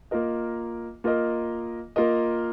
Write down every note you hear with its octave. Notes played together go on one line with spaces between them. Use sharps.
A#3 F4 A#4 D#5
A#3 F4 A#4 D#5
A#3 F4 A#4 D#5